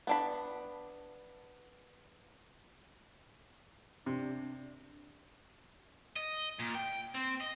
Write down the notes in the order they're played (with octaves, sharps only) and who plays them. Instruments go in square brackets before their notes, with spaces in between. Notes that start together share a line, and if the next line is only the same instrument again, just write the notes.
[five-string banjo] B3 D4 B5
[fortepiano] C3 [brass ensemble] D4
[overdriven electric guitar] D#5
A#2
G5
C4
D#5